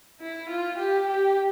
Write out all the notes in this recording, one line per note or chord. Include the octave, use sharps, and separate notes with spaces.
E4
F4
G4
G4